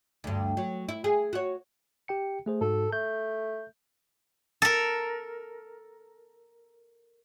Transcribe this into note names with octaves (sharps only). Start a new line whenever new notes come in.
D2 G2
F#3
E4
G#4
F#4 C#5
G4 G5 C#7
A3 G#4 C5
G#2 F#4 A4
A3 G6
A4 A#4